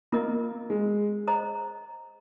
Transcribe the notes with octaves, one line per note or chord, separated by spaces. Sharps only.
A#3 F4 A#4 D#5
G#3
C5 D#5 A#5